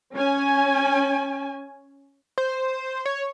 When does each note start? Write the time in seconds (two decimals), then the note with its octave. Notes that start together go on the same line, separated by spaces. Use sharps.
0.16 C#4 G#5
2.38 C5
3.06 C#5